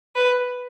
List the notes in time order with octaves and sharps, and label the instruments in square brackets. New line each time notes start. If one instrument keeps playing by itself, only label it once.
[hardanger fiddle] B4